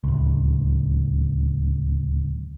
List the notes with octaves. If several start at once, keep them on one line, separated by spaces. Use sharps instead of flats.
D1 C#2